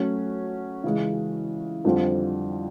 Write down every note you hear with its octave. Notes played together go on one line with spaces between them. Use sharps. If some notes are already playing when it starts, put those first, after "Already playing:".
Already playing: F#3 A3 C#4 F#4
C#3 E3 G#3
F2 D3 G3 C4 F4